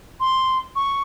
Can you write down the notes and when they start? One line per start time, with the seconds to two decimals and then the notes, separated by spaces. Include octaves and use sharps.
0.20 C6
0.76 C#6